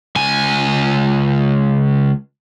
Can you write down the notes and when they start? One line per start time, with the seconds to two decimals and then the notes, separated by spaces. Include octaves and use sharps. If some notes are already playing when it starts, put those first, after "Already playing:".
0.16 C#2 G#5